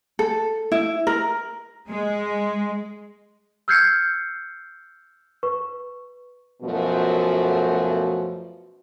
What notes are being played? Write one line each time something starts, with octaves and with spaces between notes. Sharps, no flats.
A4
E4
A#4
G#3
E6 F6 G6 G#6 C7 C#7
B4 C#6
F#2 B2 F3 A3 F#4